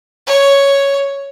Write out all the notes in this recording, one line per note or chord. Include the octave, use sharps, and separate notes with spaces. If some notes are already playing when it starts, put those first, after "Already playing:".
C#5